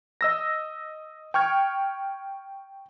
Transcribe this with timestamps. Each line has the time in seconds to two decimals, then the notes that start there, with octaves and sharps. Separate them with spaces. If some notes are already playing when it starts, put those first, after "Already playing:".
0.21 D#5 E6 A#6
1.34 G5 C#6 F6 G#6